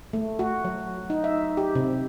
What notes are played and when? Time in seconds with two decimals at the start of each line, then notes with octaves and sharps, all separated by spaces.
0.13 A3
0.39 F#4
0.65 F#3
1.10 D#4
1.24 E5
1.57 G4
1.75 C3